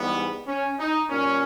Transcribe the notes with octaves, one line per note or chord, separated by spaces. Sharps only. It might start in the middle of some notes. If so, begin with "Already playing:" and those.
Already playing: G#2 E3 G3 B3
C#4
D#4
A#2 G3 C#4